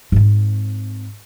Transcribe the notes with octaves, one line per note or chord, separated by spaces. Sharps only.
G#2 C4